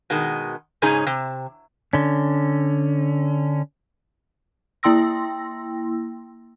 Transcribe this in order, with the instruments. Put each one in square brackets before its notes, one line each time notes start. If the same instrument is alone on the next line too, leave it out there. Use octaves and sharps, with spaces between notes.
[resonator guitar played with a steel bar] B2 D#3 G#3
G#2 C#3 C#4 D#4 G#4 A#5
C3
[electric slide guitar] D3 C#4
[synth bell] A#3 E4 G5 C6 E6 A#6